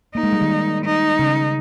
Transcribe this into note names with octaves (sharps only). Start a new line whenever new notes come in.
A#3 D#4
G#3
G3
D#3
D#4
C#3